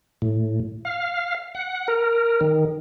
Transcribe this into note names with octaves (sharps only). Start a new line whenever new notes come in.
A2
F5
F#5
A#4
D#3